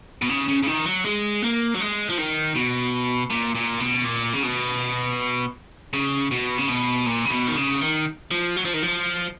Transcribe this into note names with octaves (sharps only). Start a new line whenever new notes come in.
B2
C#3
C#3
C#3
D#3
F#3
G#3
A#3
F#3
G#3
F3
D#3
B2
A#2
A#2
B2
A#2
C#3
B2
C#3
B2
C#3
B2
A#2
C#3
B2
D#3
C#3
D#3
F3
F#3
F3
D#3
F3